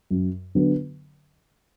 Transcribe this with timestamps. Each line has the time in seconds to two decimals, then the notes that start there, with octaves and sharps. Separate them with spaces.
0.10 F#2
0.55 D3 F#3 B3